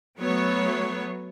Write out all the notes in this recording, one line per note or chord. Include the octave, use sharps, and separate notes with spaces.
F#3 A3 B3 C#5